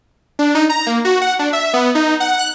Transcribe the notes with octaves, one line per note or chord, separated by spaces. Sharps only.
D4
D#4
A#5
A#3
F#4
F#5
D4
E5
B3
D#4
F#5
F#6